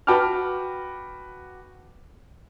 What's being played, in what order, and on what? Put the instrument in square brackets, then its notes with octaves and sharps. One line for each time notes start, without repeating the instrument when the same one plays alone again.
[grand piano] F#4 B4 G5 A5 D6 F6